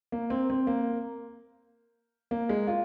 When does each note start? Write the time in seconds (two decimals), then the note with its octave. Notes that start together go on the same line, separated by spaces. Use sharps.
0.12 A#3
0.30 C4
0.50 C4
0.67 A#3
2.31 A#3
2.49 G#3
2.67 F4